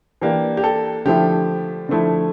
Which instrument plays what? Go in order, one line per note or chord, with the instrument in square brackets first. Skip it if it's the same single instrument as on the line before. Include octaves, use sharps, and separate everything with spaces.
[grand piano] E3 A#3 D4 G4
G4
A4
D3 F3 A3 E4 G4
D3 F3 A3 E4